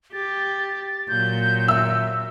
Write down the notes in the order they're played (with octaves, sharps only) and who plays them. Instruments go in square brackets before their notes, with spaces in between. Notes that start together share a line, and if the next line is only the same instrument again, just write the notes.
[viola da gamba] G4 [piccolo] A6
[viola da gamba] A#2 F#3 [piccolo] G6
[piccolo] E5 [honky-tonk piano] E6